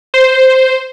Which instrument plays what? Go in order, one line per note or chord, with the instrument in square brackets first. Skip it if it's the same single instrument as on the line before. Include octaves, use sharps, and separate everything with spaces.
[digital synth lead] C5